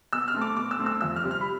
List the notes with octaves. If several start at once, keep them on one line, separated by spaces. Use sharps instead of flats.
B2 E6
F6
A3 C4
D6
B2 D6
E6
A3 C4
E6
F2 E6
F6
C3 G3 C4
F6
B5